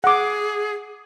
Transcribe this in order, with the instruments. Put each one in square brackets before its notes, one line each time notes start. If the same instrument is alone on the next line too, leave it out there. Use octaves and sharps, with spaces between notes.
[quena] G#4 [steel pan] F#5 D6